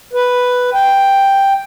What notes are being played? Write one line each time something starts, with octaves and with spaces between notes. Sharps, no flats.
B4
G5